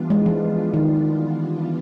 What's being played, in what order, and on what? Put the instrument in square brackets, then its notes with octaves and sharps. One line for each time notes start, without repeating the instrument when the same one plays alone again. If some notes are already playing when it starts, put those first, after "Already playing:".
Already playing: [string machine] E3 G3 B3 D4 F4
[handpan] G#3
F3
D#3